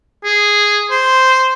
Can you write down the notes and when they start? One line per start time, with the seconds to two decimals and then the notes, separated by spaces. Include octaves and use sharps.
0.25 G#4
0.91 C5